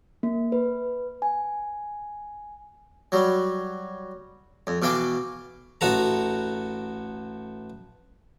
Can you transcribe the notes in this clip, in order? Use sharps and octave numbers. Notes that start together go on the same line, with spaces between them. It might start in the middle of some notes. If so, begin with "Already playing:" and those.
A#3
B4
G#5
F#3 G3
F2
B2 E3 F5 G5 D6
A1 F#4 A4 A#5